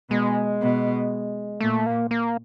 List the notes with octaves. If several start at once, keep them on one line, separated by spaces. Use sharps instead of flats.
B2 G#3
B2
A#2 A3
A#3
A#3